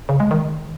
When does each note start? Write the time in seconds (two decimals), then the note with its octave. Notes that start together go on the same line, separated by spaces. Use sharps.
0.09 C#3
0.20 G#3
0.31 D#3